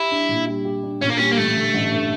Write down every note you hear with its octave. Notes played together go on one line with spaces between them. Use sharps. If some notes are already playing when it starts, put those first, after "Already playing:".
Already playing: E4 G4
D4
A#2
G3
G4
D4
A#2 C#4
A#3
G3 C#4
A#3
A1 A3
D3
A1
G2